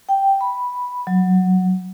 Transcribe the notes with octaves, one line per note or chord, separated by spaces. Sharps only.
G5
B5
F#3